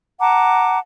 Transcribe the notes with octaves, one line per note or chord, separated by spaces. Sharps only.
F#5 A5 A#5 D6